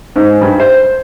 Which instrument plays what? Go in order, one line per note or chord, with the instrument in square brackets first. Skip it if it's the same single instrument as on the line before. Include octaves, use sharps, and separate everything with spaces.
[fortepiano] G#2
G2
C5